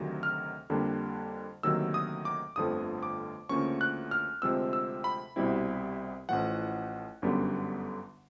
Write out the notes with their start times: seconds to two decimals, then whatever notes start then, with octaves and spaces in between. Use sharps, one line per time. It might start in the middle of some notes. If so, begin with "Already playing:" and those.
Already playing: D2 C3 D#3 F#3
0.23 F6
0.70 F2 D3 G3 A#3 D4
1.63 D2 C3 D#3 F#3 A#3 E6
1.94 D#6
2.25 D6
2.56 G1 F2 D3 F3 A3 D#6
3.03 D6
3.49 D2 C#3 F3 A#3 C#4 C#6
3.81 F#6
4.11 F6
4.42 D2 C3 F3 G#3 C4 E6
4.73 E6
5.04 B5
5.36 C2 B2 G3 C4 E4
6.29 A1 A2 F3 F#5
7.22 G1 F#2 D3 G3 B3